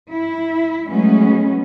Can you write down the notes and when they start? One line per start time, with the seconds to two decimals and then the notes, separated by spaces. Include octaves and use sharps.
0.11 E4
0.88 F#3 G#3 A3 B3 C#4